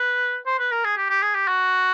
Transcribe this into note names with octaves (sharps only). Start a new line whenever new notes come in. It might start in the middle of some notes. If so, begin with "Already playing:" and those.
Already playing: B4
C5
B4
A#4
G#4
G4
G4
G#4
G4
F#4